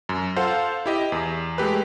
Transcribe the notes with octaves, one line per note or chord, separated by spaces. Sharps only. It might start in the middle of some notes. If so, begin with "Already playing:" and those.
F#2
F4 A4 C5 F5 F#5
E4 G4 D#5
E2
G#3 A3 G4 B4